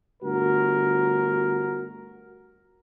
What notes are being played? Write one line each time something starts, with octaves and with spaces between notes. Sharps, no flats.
G1 D2 F#4 A#4